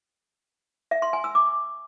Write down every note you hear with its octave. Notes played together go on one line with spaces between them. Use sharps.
E5
C6
G#5
E6
D6